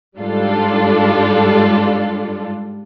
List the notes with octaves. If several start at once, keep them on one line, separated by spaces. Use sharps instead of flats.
G#2 G3 D4 F4 A4